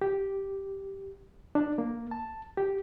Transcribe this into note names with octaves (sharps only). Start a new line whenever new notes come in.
G4
D4
A#3
A5
G4